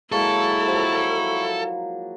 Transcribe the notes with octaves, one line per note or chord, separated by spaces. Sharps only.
F#3 G#3 A#3 E4 A4 C#6
F3 F#3